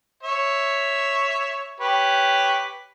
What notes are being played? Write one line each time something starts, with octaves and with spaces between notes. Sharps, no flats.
C#5 E5
G4 B4 C#5